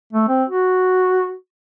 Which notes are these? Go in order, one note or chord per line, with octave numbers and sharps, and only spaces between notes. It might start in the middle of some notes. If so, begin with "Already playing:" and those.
A3
C4
F#4